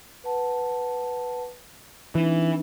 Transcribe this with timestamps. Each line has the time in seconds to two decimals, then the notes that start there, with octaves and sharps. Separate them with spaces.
0.24 B4 F#5 A5
2.15 E3 C4 D4 D#4